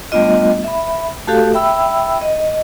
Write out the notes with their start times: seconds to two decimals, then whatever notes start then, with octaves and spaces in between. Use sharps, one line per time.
0.12 G3 A3 B3 D4 F4 D#5
0.64 E5 B5
1.28 A3 F#4 G4 A4 F5
1.54 E5 G5 B5 E6
2.22 D#5